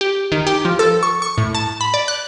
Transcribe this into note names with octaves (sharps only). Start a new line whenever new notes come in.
G4
D#3
G4
F3
A4
C#6
C#6
A2
A5
B5
D5
F#6